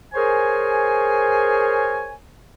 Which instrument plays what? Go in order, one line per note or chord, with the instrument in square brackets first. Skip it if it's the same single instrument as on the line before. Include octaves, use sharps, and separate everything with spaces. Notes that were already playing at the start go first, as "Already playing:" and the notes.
[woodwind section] G#4 A#4 C5 C#5 G#5